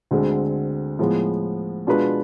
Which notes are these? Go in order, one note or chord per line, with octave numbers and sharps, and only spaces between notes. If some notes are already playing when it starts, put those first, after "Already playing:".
D2 D3 G#3 C4
A2 F3 G#3 B3
B2 G#3 D4 F4 B4